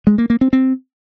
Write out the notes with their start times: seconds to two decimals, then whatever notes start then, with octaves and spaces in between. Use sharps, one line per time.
0.07 G#3
0.18 A#3
0.30 A#3
0.41 C4
0.53 C4